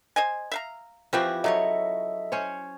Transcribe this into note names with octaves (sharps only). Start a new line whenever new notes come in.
C5 D#5 G#5
E5 F5 A#5
E3 F3 C4 E4 F#4 G4
C#3 F3 F#3 A4 C#5 D#5 E5
C#4 C5 C#5